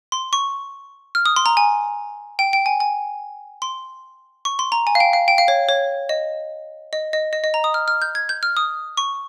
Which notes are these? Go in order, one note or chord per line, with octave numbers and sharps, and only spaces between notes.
C6
C#6
F6
D#6
C6
A#5
G#5
G5
G5
G#5
G#5
C6
C#6
C6
A#5
G#5
F5
G5
F5
G5
F5
C#5
C#5
D#5
D#5
D#5
D#5
D#5
A#5
D#6
F6
F6
G6
G#6
G6
F6
D#6
C#6